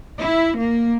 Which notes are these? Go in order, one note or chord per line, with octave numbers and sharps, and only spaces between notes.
E4
A#3